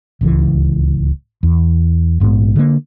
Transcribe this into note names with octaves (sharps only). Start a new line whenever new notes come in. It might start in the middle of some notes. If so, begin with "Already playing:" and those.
D1 C#2 E3
E2
A#1 G#2 F#3 B3
D3 A#3